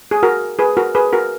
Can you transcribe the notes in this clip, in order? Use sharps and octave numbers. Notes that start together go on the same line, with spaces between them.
G#4
F#4 A#4
G#4 B4
F#4 A#4
G#4 B4
F#4 A#4